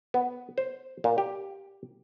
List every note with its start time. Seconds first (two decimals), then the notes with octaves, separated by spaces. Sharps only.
0.14 B3
0.58 C5
1.04 A#2
1.18 G4